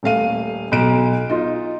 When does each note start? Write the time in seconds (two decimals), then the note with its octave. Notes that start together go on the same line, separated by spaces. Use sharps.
0.03 D#1 A3 F5 D#7
0.72 B1 D7 E7
1.29 D#4 F4